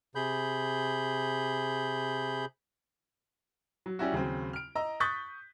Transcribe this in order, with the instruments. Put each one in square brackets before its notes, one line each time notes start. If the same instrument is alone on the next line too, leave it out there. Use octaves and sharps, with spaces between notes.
[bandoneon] C3 G#4 B5 G6
[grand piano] F#3
G3 C#4 E4 F#4
D#2 C#3 F#3 C4
F6 D7
D#5 A#5 E6
C#6 D#6 F#6 G6 A6 B6